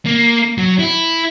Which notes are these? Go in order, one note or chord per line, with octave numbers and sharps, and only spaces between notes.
A#3
F#3
E4